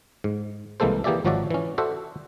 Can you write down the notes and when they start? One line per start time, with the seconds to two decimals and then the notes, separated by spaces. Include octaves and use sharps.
0.24 G#2
0.80 C2 E3 G#3 A#3 A4 C5
1.04 E3 A#3 G4 G#4 D5 E5
1.25 G#1 F3 F#3 F#4 D5 E5
1.50 E3 C#4
1.78 F#4 A4 C5 D5 E5 F#5